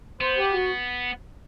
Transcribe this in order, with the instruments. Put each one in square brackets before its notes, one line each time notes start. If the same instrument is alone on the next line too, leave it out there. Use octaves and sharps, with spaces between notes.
[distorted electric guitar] B3 [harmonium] C5
[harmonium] G4
F#4